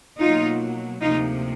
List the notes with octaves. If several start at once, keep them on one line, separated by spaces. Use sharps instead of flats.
B2 F#3 A#3 D#4 F4
D2 C3 F3 A#3 D#4 F4